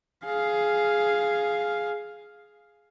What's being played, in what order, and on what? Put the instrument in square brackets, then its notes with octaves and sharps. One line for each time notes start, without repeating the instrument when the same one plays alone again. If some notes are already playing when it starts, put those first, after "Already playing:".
[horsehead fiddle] G#4 F5